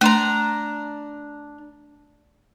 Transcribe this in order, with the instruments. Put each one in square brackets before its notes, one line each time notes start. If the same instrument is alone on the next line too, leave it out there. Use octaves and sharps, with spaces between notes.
[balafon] A3 C6 [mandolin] D4 A#5